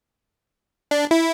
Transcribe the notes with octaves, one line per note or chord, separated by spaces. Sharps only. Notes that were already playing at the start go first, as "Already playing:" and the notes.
D4
E4